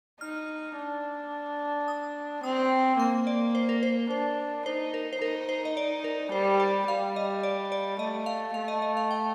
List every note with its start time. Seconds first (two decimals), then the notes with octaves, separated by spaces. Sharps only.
0.21 D#4 F6
0.77 D4
1.88 D#6
2.43 C4 D#6
2.99 A#3 C6
3.27 D5
3.55 C5
3.69 A#4
3.83 C5
4.11 D4 C5
4.66 D#4 C5
4.94 A#4
5.13 C5
5.22 D#4 A#4
5.49 C5
5.65 D#5
5.77 D5
6.04 A#4
6.32 G3 C5
6.60 D5
6.88 G3 F5
7.16 D#5
7.43 D5
7.72 D5
7.99 A3 D#5
8.26 F5
8.54 A3 F5
8.68 D#5
8.82 D#5
8.97 F5
9.11 G5